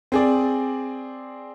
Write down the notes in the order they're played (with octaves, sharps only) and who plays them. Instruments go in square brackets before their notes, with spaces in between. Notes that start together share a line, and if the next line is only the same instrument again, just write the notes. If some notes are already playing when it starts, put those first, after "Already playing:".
[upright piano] C4 G#4 D5